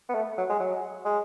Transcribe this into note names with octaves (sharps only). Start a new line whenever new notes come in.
B3
A3
F#3
G#3
F#3
G#3